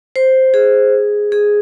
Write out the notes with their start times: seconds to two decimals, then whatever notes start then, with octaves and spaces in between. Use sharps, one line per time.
0.16 C5
0.54 G#4
1.32 G#4